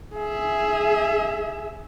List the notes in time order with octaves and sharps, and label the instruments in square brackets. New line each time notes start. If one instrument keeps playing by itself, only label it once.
[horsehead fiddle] G#4 E5